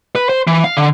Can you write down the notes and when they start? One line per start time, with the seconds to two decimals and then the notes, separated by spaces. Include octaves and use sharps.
0.15 B4
0.29 C5
0.47 E3
0.64 F5
0.77 D3